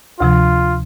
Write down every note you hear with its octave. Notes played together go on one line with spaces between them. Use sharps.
D2 C3 F3 F4